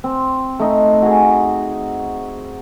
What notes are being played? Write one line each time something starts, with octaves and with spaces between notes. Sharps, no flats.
C4
A3 D#4
F#4 G#4